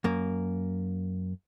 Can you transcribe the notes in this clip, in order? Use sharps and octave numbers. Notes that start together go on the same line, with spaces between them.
F#2 A#3